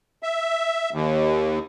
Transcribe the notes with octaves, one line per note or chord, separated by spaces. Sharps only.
E5
D#2